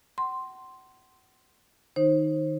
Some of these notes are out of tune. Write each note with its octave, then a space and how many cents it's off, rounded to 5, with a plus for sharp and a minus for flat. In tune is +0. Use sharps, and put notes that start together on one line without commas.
F#5 +35 C6 +0
D#3 -10 D#4 +0 C5 +30